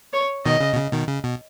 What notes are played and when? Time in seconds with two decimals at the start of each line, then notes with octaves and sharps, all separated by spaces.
0.13 C#5
0.46 B2 D#3 D#5
0.60 C#3
0.73 B2
0.76 C#3
0.92 B2 D#3
1.08 C#3
1.24 B2